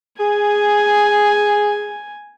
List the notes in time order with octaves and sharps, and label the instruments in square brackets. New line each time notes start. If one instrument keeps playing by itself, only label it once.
[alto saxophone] G#4 [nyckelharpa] G#5